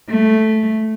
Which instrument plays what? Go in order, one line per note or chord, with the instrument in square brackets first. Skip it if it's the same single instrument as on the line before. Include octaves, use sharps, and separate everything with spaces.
[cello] A3